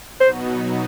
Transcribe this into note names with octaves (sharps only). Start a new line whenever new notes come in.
B2 F#3 B3 D#4 F#4 C5